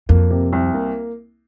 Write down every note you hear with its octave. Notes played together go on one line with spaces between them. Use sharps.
F2 A#3
C3
C2
A#3